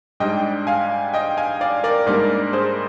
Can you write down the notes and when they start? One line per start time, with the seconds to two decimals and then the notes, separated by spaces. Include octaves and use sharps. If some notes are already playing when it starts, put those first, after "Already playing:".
0.20 G#2 G3 D4 D#5 G5
0.67 F5 G#5
1.14 D#5 G5
1.37 F5 G#5
1.61 D5 F5
1.84 A#4 D5
2.06 G#2 G3 A#3 D4 A#4 D5
2.53 G#4 C5